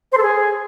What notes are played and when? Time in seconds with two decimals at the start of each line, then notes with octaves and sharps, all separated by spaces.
0.12 C5
0.17 A4
0.23 G#4